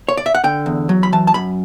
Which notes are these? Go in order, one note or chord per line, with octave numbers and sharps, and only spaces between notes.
C#5
D5
E5
F#5
D3 G5
E2
F#3
B5
E3 A5
A5
F#2 B5